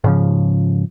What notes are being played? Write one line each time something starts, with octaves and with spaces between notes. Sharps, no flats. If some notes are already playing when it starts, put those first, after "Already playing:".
G#2 C#3 F3